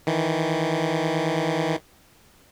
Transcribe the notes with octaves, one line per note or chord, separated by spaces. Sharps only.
D#3 E3